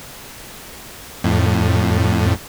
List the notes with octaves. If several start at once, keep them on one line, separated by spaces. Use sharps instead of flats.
F2 A2